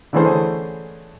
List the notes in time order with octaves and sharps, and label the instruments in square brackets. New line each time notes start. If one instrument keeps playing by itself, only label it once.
[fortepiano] D3 E3 A3 C#4 G#4 C5